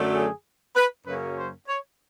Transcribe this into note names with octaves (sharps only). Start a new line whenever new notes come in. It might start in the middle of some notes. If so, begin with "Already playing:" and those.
Already playing: F#2 D3 F#3 A3
G#4
B4
F#2 C#3 F#3 A#3 C#4 B4
C5
C#5